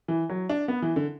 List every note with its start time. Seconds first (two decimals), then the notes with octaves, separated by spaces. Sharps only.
0.08 E3
0.30 F#3
0.49 D4
0.68 B3
0.82 E3
0.96 D3